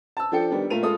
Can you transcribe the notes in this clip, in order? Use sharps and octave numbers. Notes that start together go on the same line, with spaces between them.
A5 E6
F3 D4 A4 G5 C#7
D#3 G3 B3 D4
A#2 A3 F4 A#4 D#7 F7
G#3 F4 A4 D#6